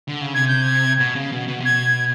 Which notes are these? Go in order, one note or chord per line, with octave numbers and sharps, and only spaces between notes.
D3
C#3
C3 G#6
G6
G#6
B2
C#3
B2
B2
C3
B2 G#6